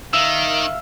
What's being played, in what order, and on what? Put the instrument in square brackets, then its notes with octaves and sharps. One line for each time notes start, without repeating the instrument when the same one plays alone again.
[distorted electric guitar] D#3 [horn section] E5 F5 [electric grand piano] E6